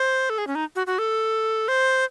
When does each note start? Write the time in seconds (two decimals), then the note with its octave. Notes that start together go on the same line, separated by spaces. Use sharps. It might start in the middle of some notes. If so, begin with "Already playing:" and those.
Already playing: C5
0.30 A4
0.38 G#4
0.47 C#4
0.55 D#4
0.76 F#4
0.87 F#4
0.99 A4
1.68 C5